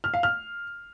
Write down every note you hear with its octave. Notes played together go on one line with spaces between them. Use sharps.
F6
F5
F6